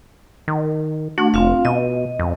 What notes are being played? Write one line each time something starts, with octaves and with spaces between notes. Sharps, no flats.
D#3
A3 D4 F#4
F1 C4 F4 F5
B2 D#5
F2